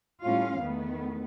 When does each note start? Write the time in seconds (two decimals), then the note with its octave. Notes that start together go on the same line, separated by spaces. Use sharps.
0.22 A2 G3 C#4 F4 F5
0.60 E2 D#3 A3 B3